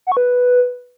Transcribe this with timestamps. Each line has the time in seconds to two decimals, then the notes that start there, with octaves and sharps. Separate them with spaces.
0.07 F#5
0.12 C#6
0.17 B4